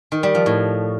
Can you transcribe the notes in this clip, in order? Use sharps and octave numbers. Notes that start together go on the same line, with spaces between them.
D#3
G3
F3
A2